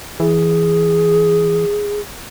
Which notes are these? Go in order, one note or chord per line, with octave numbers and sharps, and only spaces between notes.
E3 G#4